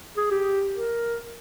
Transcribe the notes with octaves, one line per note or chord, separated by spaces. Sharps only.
G#4
G4
A#4